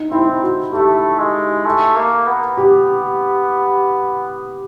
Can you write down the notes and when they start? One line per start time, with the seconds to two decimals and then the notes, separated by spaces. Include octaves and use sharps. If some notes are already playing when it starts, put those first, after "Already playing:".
Already playing: D#4
0.11 C4 E4
0.42 F#4
0.73 A3 G4
1.19 G#3
1.65 A3
1.96 A#3
2.27 B3
2.57 G4